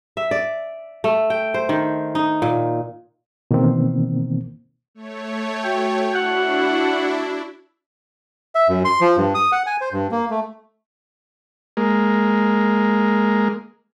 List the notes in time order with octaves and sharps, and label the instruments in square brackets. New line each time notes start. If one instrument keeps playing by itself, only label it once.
[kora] E5
D5
A3
G5
C5
D#3
D#4
A#2
[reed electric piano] B2 D#3 E3 A#3 C4
[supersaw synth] A3 C#5
[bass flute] F#4 [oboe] G5
[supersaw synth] D4 E4 [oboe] F#5
[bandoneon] E5
F#2
C6
F3
G2
D#6
F#5
G#5
C5
G2
A#3
A3
[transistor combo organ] G#3 A#3